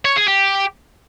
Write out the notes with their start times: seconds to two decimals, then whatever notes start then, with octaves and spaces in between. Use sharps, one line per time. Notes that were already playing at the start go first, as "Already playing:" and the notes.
0.05 C#5
0.16 G#4
0.28 G4